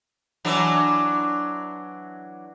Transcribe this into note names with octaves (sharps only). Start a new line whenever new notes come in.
E3 F#3 D4